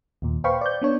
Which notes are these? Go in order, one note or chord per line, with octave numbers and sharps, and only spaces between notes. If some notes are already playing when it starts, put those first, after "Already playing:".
D#2 A#2
B4 C5 F5 G5 B5 C#6
D5 G6
B3 D4 C#5